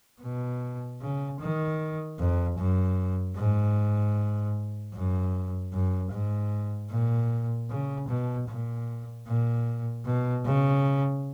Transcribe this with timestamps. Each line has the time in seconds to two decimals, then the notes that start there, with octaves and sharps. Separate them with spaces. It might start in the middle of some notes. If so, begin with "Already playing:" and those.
0.22 B2
1.01 C#3
1.40 D#3
2.19 F2
2.58 F#2
3.37 G#2
4.94 F#2
5.73 F#2
6.12 G#2
6.91 A#2
7.70 C#3
8.09 B2
8.48 A#2
9.27 A#2
10.05 B2
10.45 C#3